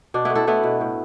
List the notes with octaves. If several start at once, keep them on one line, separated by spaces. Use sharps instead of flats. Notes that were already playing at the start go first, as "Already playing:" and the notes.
B2 D4
A3 B3 E4
E4 A4
A3 B3 E4
B2
A2